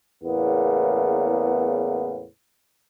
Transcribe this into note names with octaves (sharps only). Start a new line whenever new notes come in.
E2 A2 C#3 A#3 B3